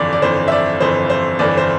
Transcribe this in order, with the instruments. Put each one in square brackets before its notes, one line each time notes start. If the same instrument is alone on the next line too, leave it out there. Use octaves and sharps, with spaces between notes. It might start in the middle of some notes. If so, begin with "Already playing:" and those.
Already playing: [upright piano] G1 F2 E3 D5
D5
G1 F2 E3 C5
E5
D5
G1 F2 E3 C5
C5
G1 F2 E3 D5
C5